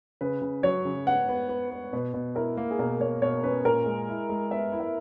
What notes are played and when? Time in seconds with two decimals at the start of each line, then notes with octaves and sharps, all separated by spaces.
0.21 C#3 B4
0.42 C#3
0.63 F#3 C#5
0.85 C#3
1.06 B3 F#5
1.29 B3
1.49 B3
1.71 B3
1.93 B2 B4
2.14 B2
2.35 E4 A#4
2.57 A#3
2.71 G#4
2.79 B2 A#4
3.00 A#3 C#5
3.22 B2 C#5
3.43 C#4 B4
3.65 A#2 A#4
3.86 G#3
4.09 E4
4.29 G#3
4.51 B3 E5
4.72 E4
4.80 E5